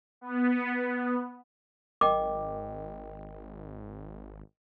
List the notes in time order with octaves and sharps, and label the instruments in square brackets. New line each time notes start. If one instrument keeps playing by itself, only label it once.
[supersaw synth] B3
[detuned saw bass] G#1 [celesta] A#4 D#5 G5 [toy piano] D6